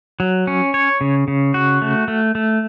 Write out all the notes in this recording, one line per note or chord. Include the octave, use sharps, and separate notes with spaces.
F#3
C#4
C#5
C#3
C#3
F#4
A3
A3
A3